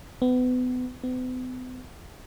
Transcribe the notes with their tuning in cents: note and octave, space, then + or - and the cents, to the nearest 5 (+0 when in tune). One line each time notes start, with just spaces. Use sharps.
B3 +30
B3 +45